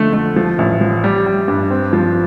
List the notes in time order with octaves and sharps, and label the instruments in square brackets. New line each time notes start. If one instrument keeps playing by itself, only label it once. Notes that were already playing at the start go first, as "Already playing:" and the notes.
Already playing: [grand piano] D3 F3 A3
A3
F3
A1
F3
G3
G3
G2
C4
F3